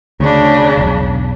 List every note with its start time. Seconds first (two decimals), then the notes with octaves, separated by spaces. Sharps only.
0.20 D2 C#3 D4
0.77 E1 B1